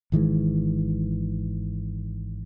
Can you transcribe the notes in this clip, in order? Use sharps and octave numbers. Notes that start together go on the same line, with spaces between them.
G#1 D#3 E3 G#3